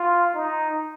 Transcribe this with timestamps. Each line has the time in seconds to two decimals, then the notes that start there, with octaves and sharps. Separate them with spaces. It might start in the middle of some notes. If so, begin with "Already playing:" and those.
Already playing: F4
0.34 D#4